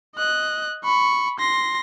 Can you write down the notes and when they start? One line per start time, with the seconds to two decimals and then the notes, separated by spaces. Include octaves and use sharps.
0.16 D#5 F#6
0.84 B5 C#6
1.39 C6 A#6